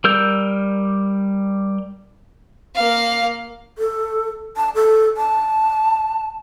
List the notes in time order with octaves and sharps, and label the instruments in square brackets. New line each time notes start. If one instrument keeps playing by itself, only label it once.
[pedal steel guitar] G3 A#4 E6 G6
[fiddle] A#3 F5
[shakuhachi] A4
A5
A4
A5